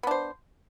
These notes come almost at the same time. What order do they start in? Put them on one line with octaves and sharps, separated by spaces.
B3 D4 C5